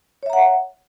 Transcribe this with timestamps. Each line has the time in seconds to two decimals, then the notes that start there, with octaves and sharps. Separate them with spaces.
0.23 C#5
0.26 E5
0.30 A#5
0.33 F#5